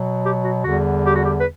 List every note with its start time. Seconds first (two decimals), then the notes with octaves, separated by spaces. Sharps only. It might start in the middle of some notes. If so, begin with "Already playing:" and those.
Already playing: B2 F#3
0.25 G4
0.45 F#4
0.65 E2 D3 G3 F#4
1.05 G4
1.15 F#4
1.25 G4
1.40 B4